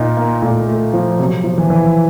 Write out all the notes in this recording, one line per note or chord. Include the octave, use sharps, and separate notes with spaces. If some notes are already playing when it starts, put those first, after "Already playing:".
Already playing: A#2 D#4 F4
A#3
A#2 A3
A3
F3
C3 F#3
F3
E3
E3